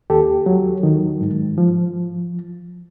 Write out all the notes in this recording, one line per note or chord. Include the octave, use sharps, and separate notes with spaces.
D#2 G4 A4
F#3
D#3
G#2
F3